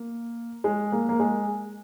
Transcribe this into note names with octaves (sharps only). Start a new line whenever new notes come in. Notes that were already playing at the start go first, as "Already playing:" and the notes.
Already playing: A#3
G#3
A#3
A#3
G#3